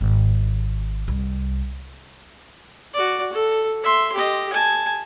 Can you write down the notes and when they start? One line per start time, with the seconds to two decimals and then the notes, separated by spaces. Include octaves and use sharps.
0.01 G#1
1.08 C2
2.94 F#4 D5
3.33 A4
3.83 E5 C6
4.14 G4 D#5
4.53 G#5 A5